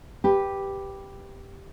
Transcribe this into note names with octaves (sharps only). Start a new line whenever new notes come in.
G4 B4